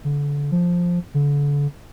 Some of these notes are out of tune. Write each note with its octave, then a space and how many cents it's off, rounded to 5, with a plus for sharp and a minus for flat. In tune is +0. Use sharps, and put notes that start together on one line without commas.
D3 -30
F3 +5
D3 -35